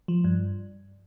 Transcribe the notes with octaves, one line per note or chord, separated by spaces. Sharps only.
F3
G2